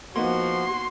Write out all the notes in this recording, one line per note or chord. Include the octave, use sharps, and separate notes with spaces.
F3 A#3 B3 D#4 F#4 C6